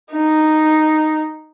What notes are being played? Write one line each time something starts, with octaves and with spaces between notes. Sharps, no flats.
D#4